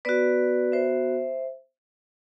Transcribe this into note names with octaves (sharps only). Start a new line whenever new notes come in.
B3 F#4 B4 D5
C5 E5